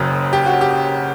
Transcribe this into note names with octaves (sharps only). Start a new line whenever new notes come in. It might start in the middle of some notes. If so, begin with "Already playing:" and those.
Already playing: F#1 F#2 C#3
G4
F#4
G4